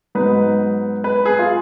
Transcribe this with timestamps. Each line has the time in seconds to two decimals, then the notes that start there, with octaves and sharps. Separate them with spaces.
0.15 G#2 F#3 B3 D#4 B4
1.04 B4
1.25 G#4
1.39 F4